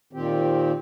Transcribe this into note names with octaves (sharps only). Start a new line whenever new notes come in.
A#2 D#3 C4 G4